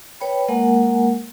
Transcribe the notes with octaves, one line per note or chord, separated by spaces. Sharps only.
B4 C#5 G5 B5
G#3 A#3 A#4 F#5 G#5